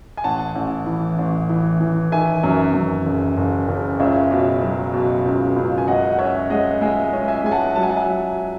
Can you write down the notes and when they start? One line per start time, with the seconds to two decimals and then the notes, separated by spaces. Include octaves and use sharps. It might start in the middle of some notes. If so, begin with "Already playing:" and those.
0.17 G#5
0.24 A1 F#5 A5
0.55 A1
0.86 E3
1.19 A1
1.49 E3
1.81 E3
2.12 D#3 E5 G#5
2.43 F#2
2.74 F#2
3.06 F#1
3.37 F#1
3.68 F#1
3.99 C#2 C#5 E5
4.31 B2
4.62 F#3
4.93 B2
5.25 C#2
5.56 C#2
5.78 G#5
5.88 F#2 D#5 F#5
6.13 F#5
6.19 C#4 C#5 E5
6.50 G#3 D#5 F#5
6.81 G#3 E5 G#5
7.13 C#4
7.28 E5 G#5
7.44 G#3 G#5
7.51 F#5 A5
7.75 F#3 A5
7.83 G#5
7.89 F#5
7.96 E5 G#5
8.07 F#3